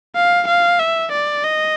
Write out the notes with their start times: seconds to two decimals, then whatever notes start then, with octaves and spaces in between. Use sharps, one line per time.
0.15 F5
0.47 F5
0.79 E5
1.12 D5
1.44 D#5